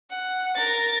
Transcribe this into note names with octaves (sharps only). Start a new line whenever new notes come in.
F#5
A#4 A6